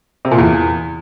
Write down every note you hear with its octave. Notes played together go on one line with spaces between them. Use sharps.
C3
A#2
E2